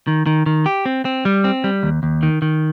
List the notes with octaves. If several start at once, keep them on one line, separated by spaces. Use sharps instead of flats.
D#3
D#3
D#3
G4
C4
C4
G3
C4
G3
D#2
D#2
D#3
D#3